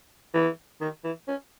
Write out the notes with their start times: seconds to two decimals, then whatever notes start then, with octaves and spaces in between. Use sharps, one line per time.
0.34 E3
0.81 D#3
1.04 E3
1.28 C#4